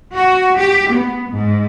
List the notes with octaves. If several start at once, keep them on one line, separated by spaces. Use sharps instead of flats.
F#4
G4
B3
G#2